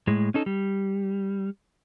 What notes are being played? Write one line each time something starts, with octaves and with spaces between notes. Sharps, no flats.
A2 G#3
C#4 D#4 A4
G3